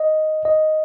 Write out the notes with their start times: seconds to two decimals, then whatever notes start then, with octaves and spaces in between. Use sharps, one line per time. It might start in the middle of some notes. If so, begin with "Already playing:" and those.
Already playing: D#5
0.45 D#5